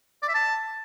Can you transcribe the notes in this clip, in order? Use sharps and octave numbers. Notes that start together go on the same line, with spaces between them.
D5
E5
A5